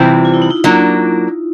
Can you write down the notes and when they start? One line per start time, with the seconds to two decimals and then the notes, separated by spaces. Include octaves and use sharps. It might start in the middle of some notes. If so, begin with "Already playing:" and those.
Already playing: C3 E3 G3 C4 F4
0.25 F4
0.34 E4
0.42 D#4
0.51 E4
0.64 F#3 A#3 D4